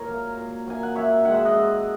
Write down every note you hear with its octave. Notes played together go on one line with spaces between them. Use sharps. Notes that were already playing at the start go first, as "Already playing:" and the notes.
Already playing: A#2 A#4 C#5
F#3 A#3
A#2
F#3 A#3 G#5
F#5
F#2 C#5 E5
D#3 G#3 F#5
E5
D#5 F#5
F#2